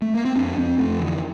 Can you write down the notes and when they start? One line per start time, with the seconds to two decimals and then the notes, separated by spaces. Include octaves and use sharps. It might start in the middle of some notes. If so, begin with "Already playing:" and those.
0.02 A3
0.14 A#3
0.25 C4
0.36 F2 D4
0.57 F2 C4
0.78 F2 A3
0.99 D3 E3